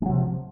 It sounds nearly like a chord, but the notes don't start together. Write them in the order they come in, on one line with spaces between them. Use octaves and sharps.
G#3 F#3 C3 F3